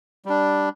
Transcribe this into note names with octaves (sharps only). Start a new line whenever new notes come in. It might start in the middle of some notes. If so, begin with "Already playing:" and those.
G3 D4